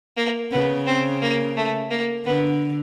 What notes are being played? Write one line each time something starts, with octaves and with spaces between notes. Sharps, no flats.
A#3
C#3 B3
C4
A#3
A3
A#3
D3 B3